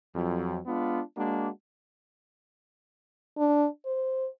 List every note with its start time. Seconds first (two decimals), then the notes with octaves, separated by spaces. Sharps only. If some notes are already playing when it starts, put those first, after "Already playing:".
0.14 F2 F#3
0.66 G#3 B3 D4 F4
1.17 G#3 A#3 D4 F#4
3.38 D4
3.86 C5